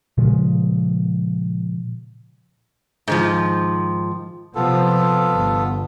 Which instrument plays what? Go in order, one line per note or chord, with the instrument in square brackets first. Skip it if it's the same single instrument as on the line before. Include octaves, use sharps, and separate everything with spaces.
[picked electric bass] A#2 C#3 F3 G#3
[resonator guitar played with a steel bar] G#2 D#3 F3
[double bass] C3 F3 [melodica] B3 F4 A4
[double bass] G1